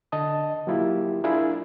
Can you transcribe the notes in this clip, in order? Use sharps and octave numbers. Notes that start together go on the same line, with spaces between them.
D3 D#5 A5 D#6
F#3 A#3 E4 F4 G4
D4 E4 F4 G#4 A#4 B5